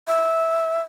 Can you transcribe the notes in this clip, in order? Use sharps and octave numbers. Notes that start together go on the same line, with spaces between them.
E5